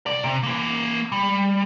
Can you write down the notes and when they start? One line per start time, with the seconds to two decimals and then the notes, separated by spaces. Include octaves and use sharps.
0.06 C2 D5
0.24 C3
0.43 E3 A#3
1.12 G3